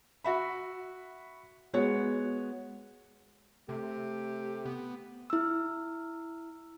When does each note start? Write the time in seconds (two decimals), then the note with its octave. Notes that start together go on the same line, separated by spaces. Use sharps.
0.24 F#4 E5 B5
1.73 G#3 B3 F#4 C#5
3.69 C3 A3 G4
4.66 B3
5.30 E4 E6